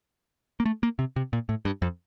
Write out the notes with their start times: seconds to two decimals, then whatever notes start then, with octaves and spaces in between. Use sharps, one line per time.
0.60 A#3
0.65 A3
0.83 A#3
0.99 C3
1.16 C3
1.33 A#2
1.49 A2
1.65 G2
1.82 F2